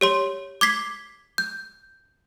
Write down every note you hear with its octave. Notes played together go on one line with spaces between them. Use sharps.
G4 C#5 C6
D6 G#6 B6 C7
G6